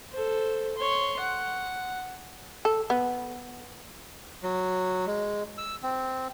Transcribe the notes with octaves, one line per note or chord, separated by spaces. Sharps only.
A4 C5
C#5 C6
F#5
A4
B3
F#3
G#3
E6
C4